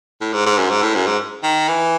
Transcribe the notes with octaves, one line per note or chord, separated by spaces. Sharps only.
A2
G#2
G#2
F#2
G#2
A2
F#2
G#2
D#3
E3